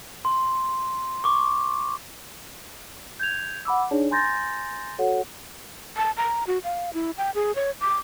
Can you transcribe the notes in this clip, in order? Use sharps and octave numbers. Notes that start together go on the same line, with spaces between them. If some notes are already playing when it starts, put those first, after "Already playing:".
C6
C#6 D6
G6 G#6 F7
F#5 B5 D6 E6
D4 D#4 G#4 C#5 D5 A5
G#5 A#5 C6 G6 A6 A#6
F#4 A4 C#5 F#5
A5
A#5
F#4
F5
E4
G5
G#4
C#5
D6